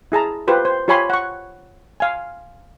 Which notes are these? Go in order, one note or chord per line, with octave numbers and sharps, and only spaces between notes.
E4 G#4 A5 A#5
F4 G4 B4 C5
C5
F4 G4 C#5 G#5 B5 C6
F#5 C#6
F5 G#5